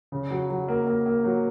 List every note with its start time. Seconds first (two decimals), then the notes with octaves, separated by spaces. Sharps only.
0.12 C#3
0.31 F#3
0.50 F#3
0.68 A#3
0.87 A#3
1.06 A#3
1.24 F#3